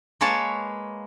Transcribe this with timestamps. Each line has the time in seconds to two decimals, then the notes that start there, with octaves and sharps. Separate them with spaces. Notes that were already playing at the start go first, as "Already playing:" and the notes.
0.21 G#3 A#3 B4 C#5 A5